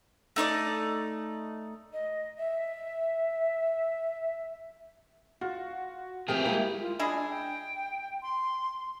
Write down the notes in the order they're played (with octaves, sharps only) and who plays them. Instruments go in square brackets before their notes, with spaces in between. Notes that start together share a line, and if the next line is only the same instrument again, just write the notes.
[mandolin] A3 D#4 C#5 D5
[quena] D#5
E5
[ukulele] F4 [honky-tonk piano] F#4
[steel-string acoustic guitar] F3 A3 C4 [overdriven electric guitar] G4 G#4 [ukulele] A#4 G5
[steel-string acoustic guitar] G#3 E4 [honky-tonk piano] A#3
[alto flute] F4
[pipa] G#3 E4 G#4 [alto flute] D4
[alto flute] G5
C6